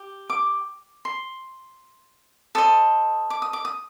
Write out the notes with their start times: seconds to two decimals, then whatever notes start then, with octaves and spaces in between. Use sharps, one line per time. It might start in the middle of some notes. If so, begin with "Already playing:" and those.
Already playing: G4
0.30 D6
1.05 C6
2.55 A4 C5 D#5 D#6
3.30 D6
3.42 D#6
3.53 D6
3.65 D#6